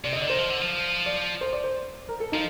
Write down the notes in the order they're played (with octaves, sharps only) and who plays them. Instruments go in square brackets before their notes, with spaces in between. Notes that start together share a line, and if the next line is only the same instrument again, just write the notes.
[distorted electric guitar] C3 [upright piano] D5
[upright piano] D#5
[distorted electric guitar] D3
[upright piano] D5
[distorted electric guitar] D#3 [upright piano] C5
[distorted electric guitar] F3
D3
F3
[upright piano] D5
C5
D5
C5
A#4
A4
[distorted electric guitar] F3 [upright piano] D#4